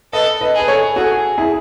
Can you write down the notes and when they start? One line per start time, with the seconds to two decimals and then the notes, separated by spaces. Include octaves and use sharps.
0.13 A4 B4 D#5
0.41 B4 D#5
0.55 G#4
0.60 B4
0.68 A4 C#5
0.96 F#4 G#4 A4
1.38 E4 G#4